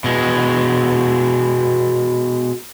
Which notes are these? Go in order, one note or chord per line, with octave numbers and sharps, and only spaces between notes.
B2 G#3